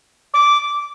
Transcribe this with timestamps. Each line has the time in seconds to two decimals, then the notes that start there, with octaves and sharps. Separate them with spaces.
0.34 D6